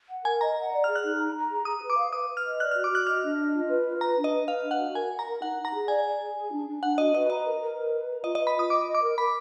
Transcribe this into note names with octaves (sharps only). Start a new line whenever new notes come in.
F#5
A#4 G#5
D#5 A#5
F#5
D5
F6
G#4
F#6
D#4
A#5
A#5
G#4
G#4 D#6
B4
D6
F5
B4 D#6
B4
F6
D#5
D5 F#6
F6
F#4
D6
F#4 F#6
D#5 F6
D4
D#5
F4
B4
F4
B4 A#5
D4
D#5
B4
B4 F5
D4
F#5
F#4
A#4 G#5
F#5
A#5
A#4
D#4 F#5
D#4
A#5
G#4
D5 G#5
D5
G#4
G#4
D4
D4
D4 F#5
F#4 D#5
B4 D#5
D#5 A#5
A#4
A#4
B4
B4
A#5
F4 D#5
D#5
B4
B5
F4 D#6
D#5 D6
D#5
D6
A#4
A#4 B5